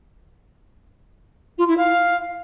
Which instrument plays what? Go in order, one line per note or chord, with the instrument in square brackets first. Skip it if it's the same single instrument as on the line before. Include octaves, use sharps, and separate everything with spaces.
[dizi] F4
E4
F5